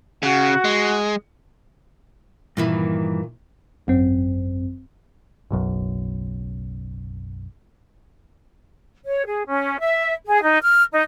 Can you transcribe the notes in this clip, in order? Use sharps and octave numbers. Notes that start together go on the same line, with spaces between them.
C#3 F#4 F#5
G#3
G2 A#2 D#3 E3 E4
G#1 F#2 C4
F#1 B1 F#2
C#5
G#4
C#4
E5
G#4
D#4
F6
D#4